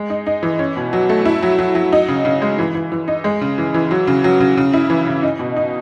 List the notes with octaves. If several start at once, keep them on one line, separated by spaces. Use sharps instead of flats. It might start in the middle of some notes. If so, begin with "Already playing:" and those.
Already playing: G#3
D#4
D#4
E3
C#4
B2
F#3
A3
E4
F#3
F#3
F#3
D#4
C#3
C#3
G#3
E3
E3
E3
D#4
G#3
C#3
E3
E3
F#3
C#3
F#3
C#3
C#3
E4
E3
C#3
D#4
B2
D#4